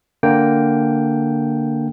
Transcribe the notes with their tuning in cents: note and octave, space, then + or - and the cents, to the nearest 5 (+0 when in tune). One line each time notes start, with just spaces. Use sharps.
D3 +5 A#3 +0 G5 +0